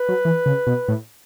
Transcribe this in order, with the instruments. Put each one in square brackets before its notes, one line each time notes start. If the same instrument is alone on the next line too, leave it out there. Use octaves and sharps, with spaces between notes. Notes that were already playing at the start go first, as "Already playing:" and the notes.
Already playing: [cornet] B4
[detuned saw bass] F#3
E3
C#3
B2
A2